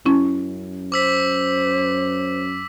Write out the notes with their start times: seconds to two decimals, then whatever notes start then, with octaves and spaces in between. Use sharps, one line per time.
0.06 F#2 C#4 E4
0.92 C5 D6 E6 B6